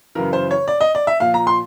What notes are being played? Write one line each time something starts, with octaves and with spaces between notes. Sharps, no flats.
F#2 C#3 E3 A#4
C5
C#5
D5
D#5
D5
E5
A#2 F3 F5
A#5
C6